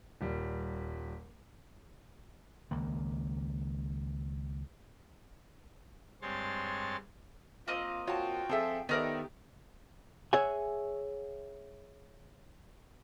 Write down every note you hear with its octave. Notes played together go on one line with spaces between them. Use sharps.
D#1 G3
C#2 D#3 A#3
G2 G#3 C4 C#5 C6 A6
A#3 C4 F4 D#5
F4 F#4 C#5 G5 A5
F3 C4 G#4 A4 E5
D#3 B3 D#4 G4 A4 A#4 D5 E5
G#4 C#5 E5 F#5 G#5